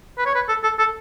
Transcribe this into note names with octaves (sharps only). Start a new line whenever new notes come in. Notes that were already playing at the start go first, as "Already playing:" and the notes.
B4
C#5
B4
A4
A4
A4